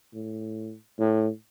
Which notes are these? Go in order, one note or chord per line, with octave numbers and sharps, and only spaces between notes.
A2
A2